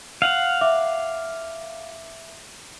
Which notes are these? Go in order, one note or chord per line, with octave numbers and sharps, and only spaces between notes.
F5 F#5
E5 D6